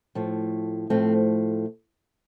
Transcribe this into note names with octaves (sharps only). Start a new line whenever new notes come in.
A2 F3 A3
A2 F3 A3 C4